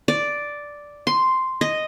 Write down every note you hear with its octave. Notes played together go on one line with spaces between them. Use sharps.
D5
C6
D#5